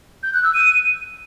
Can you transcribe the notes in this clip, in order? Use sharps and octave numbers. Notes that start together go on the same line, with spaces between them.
G6
F#6
E6
D#7